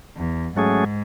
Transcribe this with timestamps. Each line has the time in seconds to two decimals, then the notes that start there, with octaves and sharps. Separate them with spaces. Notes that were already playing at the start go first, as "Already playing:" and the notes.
0.16 E2
0.56 G#2 F#3 A3 C#4 G#4